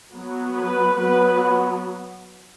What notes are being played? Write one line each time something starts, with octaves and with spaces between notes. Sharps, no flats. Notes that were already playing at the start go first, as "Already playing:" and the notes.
F#3 B3
B4
F#3 B3 B4